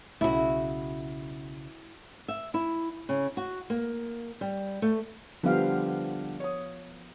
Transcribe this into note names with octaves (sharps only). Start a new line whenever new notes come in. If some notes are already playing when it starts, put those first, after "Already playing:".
B1 C#3 E4 F#4
E5
E4
C#3
F#4
A#3
G3
A3
D3 F3 G3 B3 G4 F5
C#5 D#6